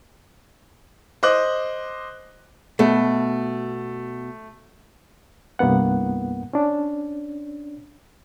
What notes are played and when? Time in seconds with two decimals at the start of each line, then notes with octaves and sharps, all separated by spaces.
1.23 C5 D#5 D6 F#6
2.79 B2 A3
5.59 C2 G2 A#3 B3 F#5
6.53 C#4 D4